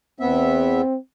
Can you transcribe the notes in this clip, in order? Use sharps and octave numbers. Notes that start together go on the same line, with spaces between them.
E2 B3 C4 E5